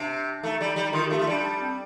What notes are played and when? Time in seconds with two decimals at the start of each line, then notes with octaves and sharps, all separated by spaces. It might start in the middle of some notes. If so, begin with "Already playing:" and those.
Already playing: C3 D4
0.43 A3 D#4
0.61 G3
0.76 G3
0.93 D#3 F4
1.06 A3 G4
1.19 A3 F4
1.27 G3 D4
1.44 D4
1.60 C4